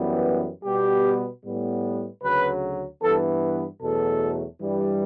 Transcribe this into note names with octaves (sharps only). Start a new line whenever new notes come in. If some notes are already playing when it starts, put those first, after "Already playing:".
Already playing: F#2 E3 G3 B3
B2 G3 B3 G4
A2 G3 B3
D2 C#3 F#3 B4
G2 E3 B3 A4
E2 B2 F#3 A3 A4
G2 E3 G3